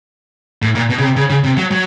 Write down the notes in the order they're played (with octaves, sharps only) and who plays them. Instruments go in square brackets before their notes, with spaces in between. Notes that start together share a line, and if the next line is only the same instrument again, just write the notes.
[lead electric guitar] A2
A#2
B2
C#3
C3
C#3
C#3
C3
F#3
F#3